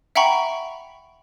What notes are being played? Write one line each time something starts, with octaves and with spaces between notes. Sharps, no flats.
E5 F#5 G5 A#5 B5 C#6